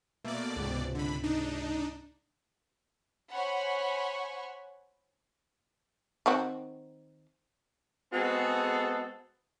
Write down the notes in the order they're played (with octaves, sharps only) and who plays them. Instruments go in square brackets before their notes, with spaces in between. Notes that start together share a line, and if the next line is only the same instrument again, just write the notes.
[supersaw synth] B2 D5 [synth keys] A3 A#3
[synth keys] C#2 G#2 C3
[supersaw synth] D3 B5
D4 D#4
[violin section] C5 C#5 F#5 G#5 B5 C#6
[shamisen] D#3 C4 F#4
[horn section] G#3 B3 C4 F#4 G#4 A4